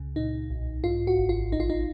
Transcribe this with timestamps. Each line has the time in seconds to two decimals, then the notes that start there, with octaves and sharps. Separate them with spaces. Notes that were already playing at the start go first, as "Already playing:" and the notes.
Already playing: C#2 C#3
0.16 A#2 D#4
0.50 B1
0.84 G#2 F4
1.07 F#4
1.18 G#1
1.29 F4
1.52 A#1 D#4
1.60 F4
1.70 D#4